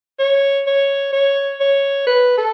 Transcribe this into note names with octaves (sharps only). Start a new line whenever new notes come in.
C#5
C#5
C#5
C#5
B4
A4